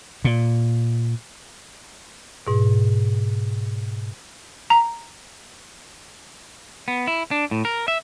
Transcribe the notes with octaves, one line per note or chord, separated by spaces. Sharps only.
A#2
G#2 B2
A#5
B3
E4
D4
A2
A#4
E5